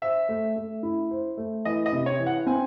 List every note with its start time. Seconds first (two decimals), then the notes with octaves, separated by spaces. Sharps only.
0.02 C5 E5
0.29 A3
0.56 A3
0.83 E4
1.11 C5
1.37 A3
1.65 E3 D#5
1.86 D#5
1.92 C3
2.06 C#5
2.20 E3
2.26 F#5
2.46 C4 G#5